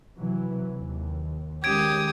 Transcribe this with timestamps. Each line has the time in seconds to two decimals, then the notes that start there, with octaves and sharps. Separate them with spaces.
0.18 C3 E3 F#3
0.78 D#2
1.64 D#3 G#3 C#4 G4 D#6 G#6 D7